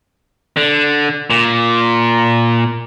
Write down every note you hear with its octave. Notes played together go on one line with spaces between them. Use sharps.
D3
A#2